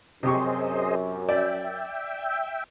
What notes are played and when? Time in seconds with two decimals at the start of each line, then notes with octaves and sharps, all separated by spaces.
0.23 F#2 C3 G4 G#4 C5 D#5 C#6
1.29 D5 E5 G5